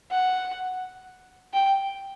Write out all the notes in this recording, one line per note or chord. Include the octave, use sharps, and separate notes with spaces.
F#5
G5